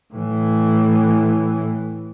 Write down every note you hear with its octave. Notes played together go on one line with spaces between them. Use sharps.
A2 E3